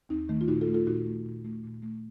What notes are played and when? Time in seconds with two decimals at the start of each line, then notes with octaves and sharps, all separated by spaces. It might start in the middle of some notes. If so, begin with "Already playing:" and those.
0.09 D#2 C4 D#4
0.29 D#3 A3
0.41 F4
0.48 A#2 D#4 F#4
0.61 F4 A4
0.68 A3
0.74 F4 A4
0.87 A#2 D#4 F#4
1.06 A3
1.25 A#2
1.44 A3
1.63 A#2
1.82 A3